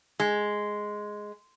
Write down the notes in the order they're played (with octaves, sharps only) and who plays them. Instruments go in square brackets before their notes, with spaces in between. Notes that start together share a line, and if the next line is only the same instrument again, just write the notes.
[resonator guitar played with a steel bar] G#3